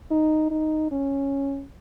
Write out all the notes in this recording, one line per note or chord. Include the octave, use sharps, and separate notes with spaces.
D#4
D#4
C#4